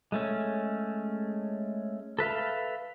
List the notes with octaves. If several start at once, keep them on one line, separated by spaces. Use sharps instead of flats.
G#3 A3 C#4
A4 B4 E5 F5